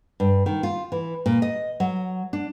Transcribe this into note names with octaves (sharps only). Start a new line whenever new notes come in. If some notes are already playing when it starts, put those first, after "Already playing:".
G2
D#3
F4
E3
A#2
D#5
F#3
D4